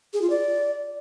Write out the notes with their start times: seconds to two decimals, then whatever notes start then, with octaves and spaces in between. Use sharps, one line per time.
0.13 G#4
0.22 F4
0.30 D5